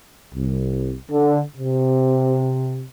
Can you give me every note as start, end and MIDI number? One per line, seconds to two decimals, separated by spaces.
0.34 0.94 36
1.10 1.39 50
1.57 2.82 48